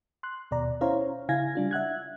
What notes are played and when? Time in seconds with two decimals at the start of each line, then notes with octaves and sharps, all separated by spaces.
0.23 C6 F#6
0.51 D#2 B2 D5 A#5
0.81 C#4 E4 C5 C#5 F5 A#5
1.29 C#3 E4 F5 G#5 G#6 A#6
1.55 G3 D4 F4
1.71 E5 F#5 F#6 G#6